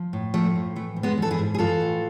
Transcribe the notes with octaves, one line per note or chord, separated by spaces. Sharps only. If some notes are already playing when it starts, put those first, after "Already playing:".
Already playing: F3
A2
F3 A3
A2
E3 A3
G#2
G#3 B3
E3 A4
E4 G#4
G#2
G#4
E3 F4 A4
A2